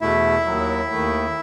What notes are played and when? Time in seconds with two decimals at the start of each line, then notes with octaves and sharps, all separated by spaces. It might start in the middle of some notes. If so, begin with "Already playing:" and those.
0.01 E2 B2 A3 E4 E5
0.46 D#2 D#3 F#3
0.90 D#2 D#3 A3